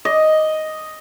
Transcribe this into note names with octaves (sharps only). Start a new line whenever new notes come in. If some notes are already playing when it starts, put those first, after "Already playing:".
D#5